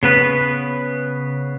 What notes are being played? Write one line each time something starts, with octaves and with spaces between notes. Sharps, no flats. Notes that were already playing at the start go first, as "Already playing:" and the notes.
C#3 B3 B4